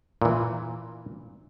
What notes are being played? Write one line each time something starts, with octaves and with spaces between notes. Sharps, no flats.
A#2 E3